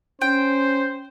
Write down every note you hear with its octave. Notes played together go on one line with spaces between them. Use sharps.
C#4 C5 G5